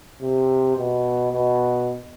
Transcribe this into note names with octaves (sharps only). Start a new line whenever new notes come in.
C3
B2
B2